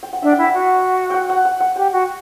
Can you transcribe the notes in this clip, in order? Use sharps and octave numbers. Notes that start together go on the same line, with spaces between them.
G5
F#5
D4 E5
G5
E4
F#5
F#4
F#5 G5
F#5
F#5
F#5
G4 G5
F#4